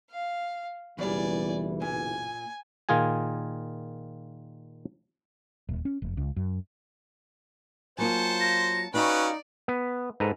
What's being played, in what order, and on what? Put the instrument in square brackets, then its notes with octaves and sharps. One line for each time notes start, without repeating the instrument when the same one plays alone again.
[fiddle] F5
[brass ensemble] F#1 B1 E3 [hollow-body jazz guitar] E2 G3 [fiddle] D5 G#5
[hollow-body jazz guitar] A#2 [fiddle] G#5
[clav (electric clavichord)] A#2 D#3 F4 G#4 G#5
[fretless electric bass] D#1
C#4
F1
C#2
F#2
[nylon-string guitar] F#3 A#3 F4 [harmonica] C5 [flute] G#5 [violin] A5 C#7
[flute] A#6
[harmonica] C#4 B4 [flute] D#4 [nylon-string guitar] F#4 F5 G5 [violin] D5
[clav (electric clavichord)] B3
G#2 A4 B4 A#5